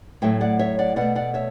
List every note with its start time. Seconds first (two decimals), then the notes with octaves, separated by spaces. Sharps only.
0.22 A2 F#3 A3 E5 G5
0.41 D5 F#5
0.59 C#5 E5
0.79 D5 F#5
0.96 B2 A3 D5 F#5
1.15 D5 F#5
1.34 C#5 E5